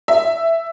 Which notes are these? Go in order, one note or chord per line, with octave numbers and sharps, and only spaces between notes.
E5